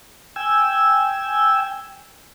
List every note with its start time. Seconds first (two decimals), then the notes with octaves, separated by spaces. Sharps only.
0.36 G5 G#5 E6